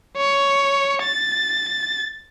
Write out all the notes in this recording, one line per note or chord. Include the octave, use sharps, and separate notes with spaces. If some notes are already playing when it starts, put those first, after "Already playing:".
C#5
A6